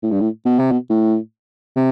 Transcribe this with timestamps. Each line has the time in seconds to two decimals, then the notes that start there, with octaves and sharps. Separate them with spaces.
0.03 A2
0.12 G2
0.21 A2
0.46 B2
0.59 C3
0.72 B2
0.90 A2
1.76 C3